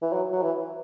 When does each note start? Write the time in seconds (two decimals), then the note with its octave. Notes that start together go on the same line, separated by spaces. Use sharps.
0.02 E3
0.13 F#3
0.32 F#3
0.43 E3